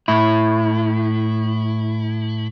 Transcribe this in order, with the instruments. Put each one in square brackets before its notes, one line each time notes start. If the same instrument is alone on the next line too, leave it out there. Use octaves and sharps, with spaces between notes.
[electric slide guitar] A2 E4